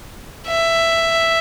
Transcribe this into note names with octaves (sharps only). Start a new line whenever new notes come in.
E5